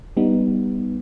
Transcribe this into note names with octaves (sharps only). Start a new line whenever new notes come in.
G3 B3 D#4